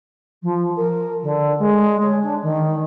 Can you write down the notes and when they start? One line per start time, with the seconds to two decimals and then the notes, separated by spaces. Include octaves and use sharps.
0.42 F3
0.76 A#4
1.22 D3
1.59 G#3
2.02 C#5
2.22 D4
2.42 D#3